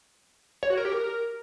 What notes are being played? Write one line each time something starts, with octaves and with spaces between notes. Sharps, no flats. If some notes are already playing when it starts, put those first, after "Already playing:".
C#5
F#4
A#4
G4
A#4